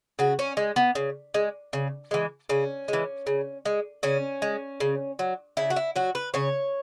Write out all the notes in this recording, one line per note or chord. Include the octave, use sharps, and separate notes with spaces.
C#3 F#4
C#4
G#3
B3
C#3
G#3
C#3
E3 G#3
C#3 C#4
E3 G#3
C#3
G#3
C#3 C#4
G#3
C#3
F#3
C#3 E4
F#4
E4
F#3 F#4
B4
C#3 C#5